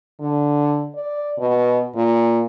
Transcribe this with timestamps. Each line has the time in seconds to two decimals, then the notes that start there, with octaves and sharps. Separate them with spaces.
0.20 D3
0.95 D5
1.39 B2
1.95 A#2